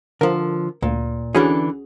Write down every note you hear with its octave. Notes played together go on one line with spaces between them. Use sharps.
D3 F3 A#4
D2 A#2
D3 E3 C#4 D4 F#4 G#4